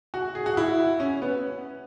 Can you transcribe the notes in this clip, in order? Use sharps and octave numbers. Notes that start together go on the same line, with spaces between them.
F#4
G#4
F#4
E4
C#4
B3